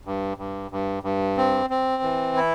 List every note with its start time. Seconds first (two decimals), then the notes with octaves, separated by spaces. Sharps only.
0.05 G2
0.37 G2
0.71 G2
1.03 G2
1.37 C4
1.70 C4
2.03 E3
2.36 E4